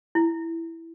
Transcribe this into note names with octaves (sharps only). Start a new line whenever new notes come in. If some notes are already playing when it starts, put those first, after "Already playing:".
E4